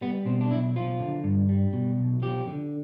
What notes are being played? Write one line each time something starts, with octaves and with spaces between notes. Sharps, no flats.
G3 B3
B2 C4
D4
B1 E4
F3 F4
D3
G2
G3
B2
B1
F3 G4
D3